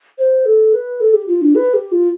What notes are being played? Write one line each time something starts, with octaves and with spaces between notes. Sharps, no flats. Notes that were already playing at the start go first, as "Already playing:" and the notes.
C5
A4
B4
A4
G4
F4
D4
B4
G4
F4